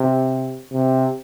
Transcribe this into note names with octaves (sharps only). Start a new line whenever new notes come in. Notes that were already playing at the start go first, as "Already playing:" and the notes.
Already playing: C3
C3